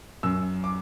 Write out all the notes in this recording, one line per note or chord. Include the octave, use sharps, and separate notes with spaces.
F#2 E6
D6